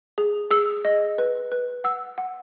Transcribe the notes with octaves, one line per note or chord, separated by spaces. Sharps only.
G#4
G#4 E6
D#5
B4
B4
F#5 E6
F#5